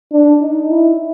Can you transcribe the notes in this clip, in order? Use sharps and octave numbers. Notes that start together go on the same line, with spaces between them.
D4
D#4
E4